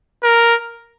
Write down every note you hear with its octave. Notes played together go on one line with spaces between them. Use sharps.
A#4